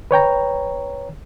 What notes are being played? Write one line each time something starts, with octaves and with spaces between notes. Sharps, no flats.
B4 C#5 G5 A#5